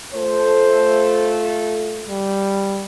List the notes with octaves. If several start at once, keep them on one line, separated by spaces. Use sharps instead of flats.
A3 F4 A4 C5
G3